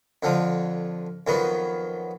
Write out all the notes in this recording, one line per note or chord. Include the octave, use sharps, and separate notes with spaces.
F2 D3 F3
F2 D#3 F#3 B3